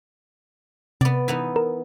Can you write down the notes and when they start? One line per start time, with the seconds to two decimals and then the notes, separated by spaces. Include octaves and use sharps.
1.01 C3 B3 D5
1.28 E3 B3 D#4
1.56 A#4